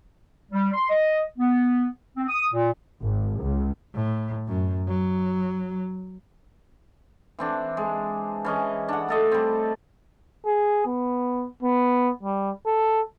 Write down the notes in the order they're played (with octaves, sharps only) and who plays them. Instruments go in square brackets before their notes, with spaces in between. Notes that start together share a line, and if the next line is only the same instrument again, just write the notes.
[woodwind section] G3
C6
D#5
B3
C4
D#6
A#2
[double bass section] G#1
C#2
[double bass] A2
F#2
F#3
[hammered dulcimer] E3 C4 D4
G#3
E3 C#4 D#5
D4 F#5
A3 A4 D#5
G3 C4
[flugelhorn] G#4
B3
B3
G3
A4